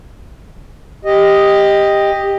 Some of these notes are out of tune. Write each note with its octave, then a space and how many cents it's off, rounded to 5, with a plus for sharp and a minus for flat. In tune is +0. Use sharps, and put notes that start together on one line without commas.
G4 +10 D#5 +0